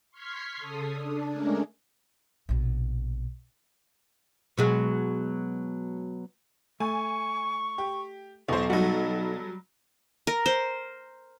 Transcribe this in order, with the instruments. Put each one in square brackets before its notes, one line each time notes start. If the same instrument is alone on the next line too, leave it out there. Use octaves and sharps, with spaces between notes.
[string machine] C6 C#6 F6 G#6 B6 C7
C#3 A4 D#6
D4
G#3 A3 C#4 D4 G#4 A#4
[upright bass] A#1 B2
[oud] B2 F#3 G#3
[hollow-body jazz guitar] A3 [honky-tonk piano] G#5 [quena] C#6
[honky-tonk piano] G4
[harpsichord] B1 [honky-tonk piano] E2 C5 [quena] C#6
[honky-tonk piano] F#3 G3 [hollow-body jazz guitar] D#4 F#4 [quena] A4
[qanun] A#4
C5